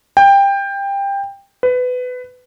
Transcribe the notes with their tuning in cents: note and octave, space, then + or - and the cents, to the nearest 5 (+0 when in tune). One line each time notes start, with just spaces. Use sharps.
G5 +20
B4 +20